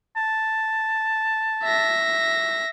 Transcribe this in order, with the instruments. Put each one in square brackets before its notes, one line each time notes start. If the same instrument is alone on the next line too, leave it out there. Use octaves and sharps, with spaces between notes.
[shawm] A5
[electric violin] E5 A#6